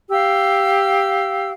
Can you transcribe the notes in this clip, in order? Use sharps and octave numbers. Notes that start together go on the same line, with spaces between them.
G4 F5 E6